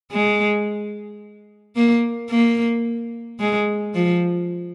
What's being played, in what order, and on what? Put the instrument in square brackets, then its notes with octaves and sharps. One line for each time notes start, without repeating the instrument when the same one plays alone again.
[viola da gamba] G#3
A#3
A#3
G#3
F3